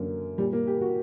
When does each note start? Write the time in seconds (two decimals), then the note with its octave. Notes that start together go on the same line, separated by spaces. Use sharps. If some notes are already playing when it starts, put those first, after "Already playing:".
Already playing: F#2 D3 A#3
0.38 A#2 G3
0.53 A#3
0.67 G4
0.81 F#4